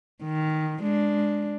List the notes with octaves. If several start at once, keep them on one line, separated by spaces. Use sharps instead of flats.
D#3
G#3 D4